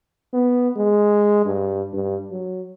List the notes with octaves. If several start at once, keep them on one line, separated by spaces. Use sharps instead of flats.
B3
G#3
G2
G2
F#3